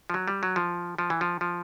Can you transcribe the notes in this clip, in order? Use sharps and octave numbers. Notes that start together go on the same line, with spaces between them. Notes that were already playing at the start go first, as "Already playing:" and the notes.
F3
F#3
G3
F#3
F3
F3
E3
F3
F3